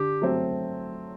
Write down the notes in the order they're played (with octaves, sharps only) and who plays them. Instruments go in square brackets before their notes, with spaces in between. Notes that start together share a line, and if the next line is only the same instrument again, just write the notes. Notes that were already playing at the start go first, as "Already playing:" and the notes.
Already playing: [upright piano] D3 [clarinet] G4
[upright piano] F#3 A3 C4